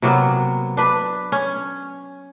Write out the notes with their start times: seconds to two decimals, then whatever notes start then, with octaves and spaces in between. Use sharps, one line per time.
0.02 C3 F#3 A#3 B3
0.77 D4 B4
1.32 C#4